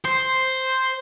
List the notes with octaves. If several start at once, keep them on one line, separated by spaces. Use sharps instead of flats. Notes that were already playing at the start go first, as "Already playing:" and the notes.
C5